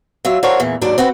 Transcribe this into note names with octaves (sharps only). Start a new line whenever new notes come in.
F#3 F4 E5
D4 F#4 A4 A#4 C5 C#5
E2 A#2 E3
D#2 G#2 F#3 D4 D5
C4 F#4 B4 G5